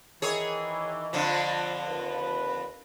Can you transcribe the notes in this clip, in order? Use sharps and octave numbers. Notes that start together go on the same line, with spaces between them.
D#3 E3 G#4 C#5
F2 D3 F3
D#2 B4